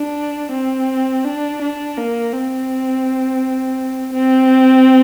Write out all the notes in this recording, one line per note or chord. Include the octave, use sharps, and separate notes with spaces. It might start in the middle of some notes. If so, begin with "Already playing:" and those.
Already playing: D4
C4
D4
D4
A#3
C4
C4